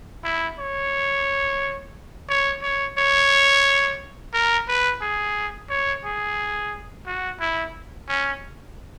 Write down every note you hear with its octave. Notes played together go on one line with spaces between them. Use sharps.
E4
C#5
C#5
C#5
C#5
A#4
B4
G#4
C#5
G#4
F#4
E4
C#4